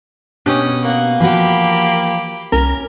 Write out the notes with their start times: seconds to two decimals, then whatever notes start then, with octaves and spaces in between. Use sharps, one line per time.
0.46 B2 C#4 D4 G4 D#6
0.85 A#3 F#5
1.20 E3 F3 F#4 G4 B5
2.52 C2 C#4 A#4